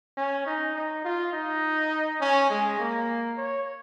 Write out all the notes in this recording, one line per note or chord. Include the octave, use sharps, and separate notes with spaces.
C#4
D#4
D#4
F4
D#4
C#4
G#3
A#3
C#5